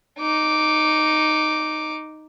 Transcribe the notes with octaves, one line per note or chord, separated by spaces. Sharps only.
D#4 D6